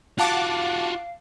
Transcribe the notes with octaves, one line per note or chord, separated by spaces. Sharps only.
F4 F#4 F5 F#5 A5 D6